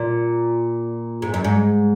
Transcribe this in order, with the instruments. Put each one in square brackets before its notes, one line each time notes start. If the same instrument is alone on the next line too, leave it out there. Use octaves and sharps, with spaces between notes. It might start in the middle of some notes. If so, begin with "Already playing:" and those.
Already playing: [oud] A#2
G#2
F#2
G#2